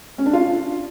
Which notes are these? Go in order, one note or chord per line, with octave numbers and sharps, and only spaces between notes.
C#4
D4
F4